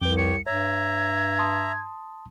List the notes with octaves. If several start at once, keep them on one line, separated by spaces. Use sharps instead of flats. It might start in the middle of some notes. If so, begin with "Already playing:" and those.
C2 F2 B4 G5 D6 G7
G4 C#5 C#7
G2 C#5 E5 A#5 G#6
A5 C6 D#6